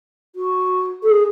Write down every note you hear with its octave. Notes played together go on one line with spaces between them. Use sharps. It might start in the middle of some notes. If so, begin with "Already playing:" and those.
F#4
A4
G#4